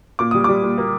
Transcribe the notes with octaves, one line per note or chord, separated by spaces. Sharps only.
A#2 D6
G3 D#6
G3 D6
A#2
A#3